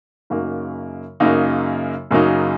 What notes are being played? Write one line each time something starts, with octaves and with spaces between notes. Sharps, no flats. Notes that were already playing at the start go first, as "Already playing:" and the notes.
F#2 C#3 F#3 A#3 D#4
F#2 C#3 F#3 A#3 D#4
F#2 C#3 F#3 A#3 D#4